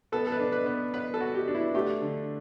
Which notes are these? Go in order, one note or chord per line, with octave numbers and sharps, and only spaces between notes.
B3 A4
A4
B4
D4
B4
B3
B3 B4
A4
F#4
G4
D4
E4
A3 G4
D3